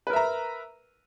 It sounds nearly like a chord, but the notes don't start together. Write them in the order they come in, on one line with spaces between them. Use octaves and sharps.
B4 A#4 E5 A#5